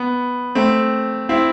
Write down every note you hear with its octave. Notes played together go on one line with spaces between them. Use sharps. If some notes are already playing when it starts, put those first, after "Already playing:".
Already playing: B3
A3 C4
C4 E4